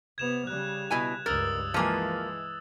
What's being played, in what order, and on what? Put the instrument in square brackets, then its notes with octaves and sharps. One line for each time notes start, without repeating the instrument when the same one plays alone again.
[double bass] C3 B3 [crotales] G#6 E7 F7
[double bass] C#3 G3 [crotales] F#6
[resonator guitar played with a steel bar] B2 E4 G#5
[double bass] C#2 G2 [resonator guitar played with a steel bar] A#4 [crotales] D#6 E6 A6
[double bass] E3 G#3 [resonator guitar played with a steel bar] F3 A#3 G#5